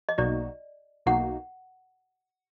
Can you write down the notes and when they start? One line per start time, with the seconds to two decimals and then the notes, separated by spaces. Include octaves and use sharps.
0.09 D#5
0.18 B1 B2 A#3 D#4 F#4 D5
1.06 B1 B2 A#3 D#4 F#4 F#5